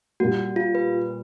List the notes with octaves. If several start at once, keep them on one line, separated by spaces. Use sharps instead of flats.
A#2 G3 A#3 F#4
F4
B4